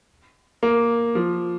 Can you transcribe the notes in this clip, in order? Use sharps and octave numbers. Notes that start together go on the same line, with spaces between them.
A#3
F3